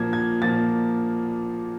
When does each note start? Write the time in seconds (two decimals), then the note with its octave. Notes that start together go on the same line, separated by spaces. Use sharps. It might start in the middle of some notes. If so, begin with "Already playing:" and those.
Already playing: A#2 F3 A#3 G#6
0.13 G#6
0.42 A#2 F3 A#3 A6